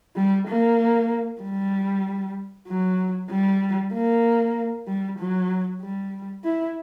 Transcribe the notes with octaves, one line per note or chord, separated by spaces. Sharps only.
G3
A#3
G3
F#3
G3
A#3
G3
F#3
G3
E4